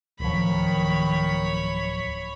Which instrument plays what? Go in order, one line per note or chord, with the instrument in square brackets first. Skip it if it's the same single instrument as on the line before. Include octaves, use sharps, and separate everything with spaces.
[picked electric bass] D1 F3 [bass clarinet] D#3 [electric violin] C#5 B5